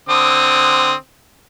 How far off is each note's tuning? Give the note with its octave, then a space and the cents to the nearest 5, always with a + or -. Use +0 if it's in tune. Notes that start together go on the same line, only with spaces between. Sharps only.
D3 +5 C4 +0 D#6 +5